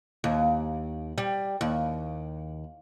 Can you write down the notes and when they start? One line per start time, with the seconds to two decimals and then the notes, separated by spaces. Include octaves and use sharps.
0.24 D#2
1.18 G3
1.61 D#2